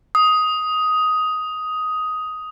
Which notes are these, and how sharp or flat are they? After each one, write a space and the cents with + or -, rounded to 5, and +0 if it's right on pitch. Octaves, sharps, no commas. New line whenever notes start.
D#6 +10